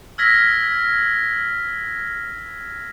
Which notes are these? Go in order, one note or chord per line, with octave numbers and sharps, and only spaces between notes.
E6 F6 G#6 A#6 B6